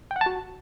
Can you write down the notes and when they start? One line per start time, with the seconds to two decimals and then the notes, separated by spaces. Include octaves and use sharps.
0.11 G5
0.16 F#5
0.21 A5
0.26 F#4